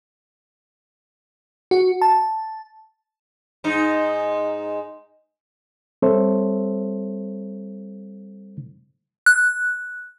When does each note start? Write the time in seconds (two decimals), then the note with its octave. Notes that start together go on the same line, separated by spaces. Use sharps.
1.71 F#4
2.02 A5
3.64 G#2 D#4
6.02 G3 C4 A4 C5 C#5 E5
9.26 F#6